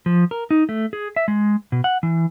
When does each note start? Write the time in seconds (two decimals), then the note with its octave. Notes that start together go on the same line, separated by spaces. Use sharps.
0.06 F3
0.31 A#4
0.51 D#4
0.69 A3
0.93 G#4
1.16 E5
1.28 G#3
1.72 B2
1.84 F#5
2.03 E3